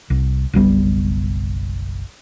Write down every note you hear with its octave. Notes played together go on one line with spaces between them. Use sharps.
C2
F#1 B1 G3 B3